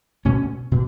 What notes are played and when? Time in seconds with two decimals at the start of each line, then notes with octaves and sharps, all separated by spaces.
0.25 B2 A3 C#4
0.71 B2